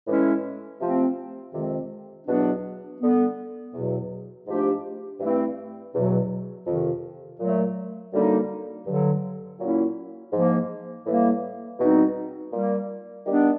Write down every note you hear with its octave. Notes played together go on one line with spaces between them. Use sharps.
A2 E3 G#3 C#4 E4
C3 F3 A3 C4
F2 C3 D#3 G#3 C4
E2 B2 F#3 B3 D4
D3 G3 B3
E2 B2 F#3
G#2 F3 A3 D4 G4
G2 E3 A3 C4 E4
E2 B2 F#3
F2 C3 D#3
A#2 F#3 A3
F#2 D3 G3 A#3 D#4
G2 D3 F#3
A#2 F#3 A#3 C#4 E4
G#2 F3 A#3
A2 E3 G3 A#3
E2 B2 G3 C4 D#4
A#2 G3 A#3
D#3 G3 B3 D4